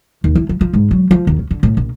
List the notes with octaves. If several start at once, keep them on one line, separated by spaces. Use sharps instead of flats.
D#2
E3
F3
F3
G#2
F#3
F3
D#2
C#3
D3
A2
A#1